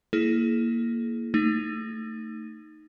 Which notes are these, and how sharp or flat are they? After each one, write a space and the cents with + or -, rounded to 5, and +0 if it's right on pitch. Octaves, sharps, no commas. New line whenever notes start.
A#3 +0 E4 +0 G#4 +35
A3 +25 D#4 -5